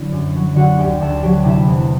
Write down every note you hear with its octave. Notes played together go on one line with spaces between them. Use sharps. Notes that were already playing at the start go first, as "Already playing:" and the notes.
Already playing: D3 F#3 E4
F#2
F#3
D3 F#4 F#5
D2 G4 G5
D2 A4 A5
F#3 G4 G5
C3 E4 E5
E2